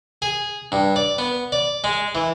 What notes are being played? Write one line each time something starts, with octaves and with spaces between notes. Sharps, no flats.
G#4
G2
D5
B3
D5
G#3
E3